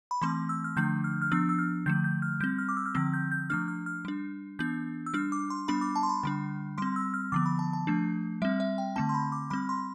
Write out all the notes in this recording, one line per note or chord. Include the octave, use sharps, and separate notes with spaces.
B5
E3 A3 C4 C6
E6
F6
D3 F3 A3 D4 G6
F6
F6
F3 B3 D4 E6
E6
F6
D3 F3 A3 G6
G6
F6
G3 C4 G6
F6
D6
E6
F6
D3 F3 C4 E6
G6
G6
F3 A3 D4 F6
F6
F6
G3 D4
E3 B3 D4 G6
E6
G3 D4 F6
D6
C6
G3 B3 D4 B5
D6
A5
C6
B5
D3 G3 D4
G3 C4 C6
E6
F6
D3 F3 B3 D6
B5
A5
A5
F3 A3 D4
G3 C4 E5
E5
G5
D3 A3 C4 A5
C6
B5
D6
G3 C4 B5
C6